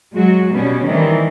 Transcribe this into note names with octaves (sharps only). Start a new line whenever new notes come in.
F#3 G#3 F#4
B2 G3 B3 C#4
D#3 E3 G3 A3 C4